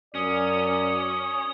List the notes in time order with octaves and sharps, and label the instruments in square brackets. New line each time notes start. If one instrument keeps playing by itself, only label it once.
[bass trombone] F#2 [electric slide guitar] C#4 [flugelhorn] D5 [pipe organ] D#6